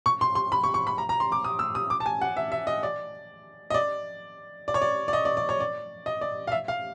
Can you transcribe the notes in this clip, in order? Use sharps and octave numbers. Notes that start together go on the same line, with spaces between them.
C#6
C6
C6
B5
C#6
C#6
B5
A#5
A#5
C6
D6
D#6
E6
D#6
D6
A5
G#5
F#5
E5
E5
D#5
D5
D#5
D5
D5
C#5
D5
D5
D#5
D5
D5
C#5
D5
D#5
D5
F5
E5
F5